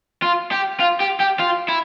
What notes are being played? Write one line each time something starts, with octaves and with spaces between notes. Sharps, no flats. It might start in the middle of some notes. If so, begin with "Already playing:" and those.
F4
G4
F4
G4
G4
F4
E4